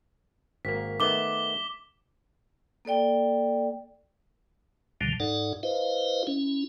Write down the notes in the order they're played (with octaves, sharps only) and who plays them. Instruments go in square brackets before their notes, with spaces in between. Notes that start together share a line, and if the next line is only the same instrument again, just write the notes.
[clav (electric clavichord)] G#1 A#3 [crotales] B6
[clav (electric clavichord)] D#3 A3 B3 [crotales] D6 G7
[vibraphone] A#3 A4 D5 G5
[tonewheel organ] D2 B2 D3 D#3 F3 G3
G#2 D#4 A4 D5 F#5
E4 B4 C5 D#5 F5
C#4 E4